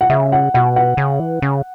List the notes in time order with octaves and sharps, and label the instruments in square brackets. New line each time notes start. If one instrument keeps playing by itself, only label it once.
[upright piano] F#5
[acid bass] C#3 [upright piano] E5
[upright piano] F#5
[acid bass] B2 [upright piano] F#5
[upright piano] F#5
[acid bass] C#3
E3
C#3